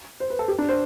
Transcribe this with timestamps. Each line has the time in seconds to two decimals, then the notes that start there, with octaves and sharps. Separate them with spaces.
0.20 C5
0.30 B4
0.39 A4
0.48 G4
0.59 D4
0.69 C5